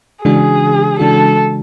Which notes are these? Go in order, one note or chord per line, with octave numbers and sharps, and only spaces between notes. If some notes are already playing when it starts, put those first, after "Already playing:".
C#3 E3 G#3 D4 F#4 G#4
C#3 E3 G#3 D4 F#4 A4